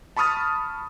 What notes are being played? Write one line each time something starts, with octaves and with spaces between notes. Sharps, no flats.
A5 B5 C#6 D#6 F6 A6